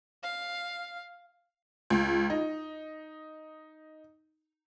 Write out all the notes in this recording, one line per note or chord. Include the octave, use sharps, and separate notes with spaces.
F5
C#2
D#4